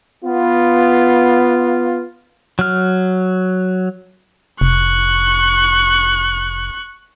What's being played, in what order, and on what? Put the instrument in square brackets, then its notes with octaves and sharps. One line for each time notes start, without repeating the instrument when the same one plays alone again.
[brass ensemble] B3 F4
[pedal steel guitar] F#3 F6
[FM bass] F1 [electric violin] C#6 F#6